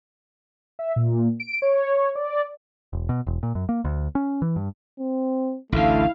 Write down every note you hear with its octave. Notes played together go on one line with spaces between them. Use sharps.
E5
A#2
D7
C#5
D5
E1
B2
E1
A#2
F#2
A#3
D2
C#4
E3
G2
C4
A1 D2 D3 A3 E4 F5